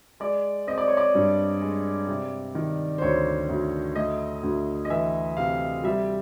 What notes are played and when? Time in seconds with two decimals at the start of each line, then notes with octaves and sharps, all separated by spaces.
0.20 G#3 D5
0.67 C4 D#5
0.78 D5
0.88 C#5
0.97 D5
1.15 G2
1.62 G#3
2.08 C3
2.55 D#3
2.98 C5
3.02 D2 C#5
3.49 D2
3.96 A3 D#5
4.43 D2
4.85 D#5
4.90 E3 E5
5.37 C3 F5
5.84 G3 E5